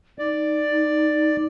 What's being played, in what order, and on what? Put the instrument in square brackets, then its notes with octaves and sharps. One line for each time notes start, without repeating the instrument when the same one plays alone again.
[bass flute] D#4 [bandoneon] D5